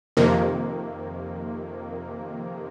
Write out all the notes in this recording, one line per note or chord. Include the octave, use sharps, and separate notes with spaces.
F2 C3 D#3 A#3